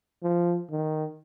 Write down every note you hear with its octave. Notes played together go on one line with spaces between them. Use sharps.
F3
D#3